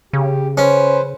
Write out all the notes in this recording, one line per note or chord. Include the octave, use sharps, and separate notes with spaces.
C#3 G4
C#4 B4 C5